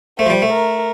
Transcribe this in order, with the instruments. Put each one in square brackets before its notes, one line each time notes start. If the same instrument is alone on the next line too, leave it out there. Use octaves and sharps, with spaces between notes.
[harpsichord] A3 [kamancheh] C5
[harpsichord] F3
G3
A3
[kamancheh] A#4